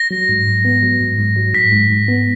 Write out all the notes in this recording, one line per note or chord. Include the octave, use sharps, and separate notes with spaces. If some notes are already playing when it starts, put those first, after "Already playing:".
Already playing: A#6
F#3
G#2
G#2
B3
F#3
G#2
G#2
F#3
G#2 B6
G#2
G#2
B3